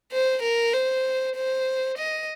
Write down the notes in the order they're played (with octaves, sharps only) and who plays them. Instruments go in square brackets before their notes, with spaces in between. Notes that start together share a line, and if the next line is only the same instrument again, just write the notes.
[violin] C5
A#4
C5
C5
D#5